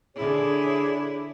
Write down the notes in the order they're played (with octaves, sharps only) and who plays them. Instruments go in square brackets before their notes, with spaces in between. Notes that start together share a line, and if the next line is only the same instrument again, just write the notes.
[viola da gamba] D3 E4 [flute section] G#4 C#5